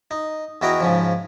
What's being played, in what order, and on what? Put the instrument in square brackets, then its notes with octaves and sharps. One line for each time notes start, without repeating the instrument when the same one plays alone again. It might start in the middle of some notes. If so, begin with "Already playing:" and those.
[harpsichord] D#4
E2 E4 F#4 D#5 G5 A#5
G#2 C#3 F3